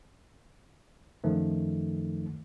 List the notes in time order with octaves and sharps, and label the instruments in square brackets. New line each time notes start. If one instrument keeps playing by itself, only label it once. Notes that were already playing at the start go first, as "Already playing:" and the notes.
[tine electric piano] F#2 D#3 F3 A3